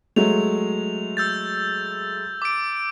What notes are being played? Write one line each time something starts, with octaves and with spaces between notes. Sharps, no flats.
F#3 G#3 A3 F7
E6 G6 A6
D6 D7